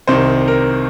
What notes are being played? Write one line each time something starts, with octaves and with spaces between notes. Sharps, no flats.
C2 C3 D#3 C5
A#4